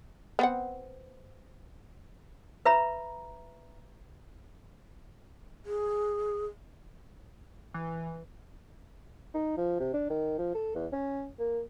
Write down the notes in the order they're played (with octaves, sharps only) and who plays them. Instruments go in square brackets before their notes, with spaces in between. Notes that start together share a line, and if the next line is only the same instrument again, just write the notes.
[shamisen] B3 C4 F#5
[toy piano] B4 E5 A#5 B5
[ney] G#4
[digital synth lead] E3
[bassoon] D#4
F3
C3
D4
D#3
F3
A4
E2
C#4
A#3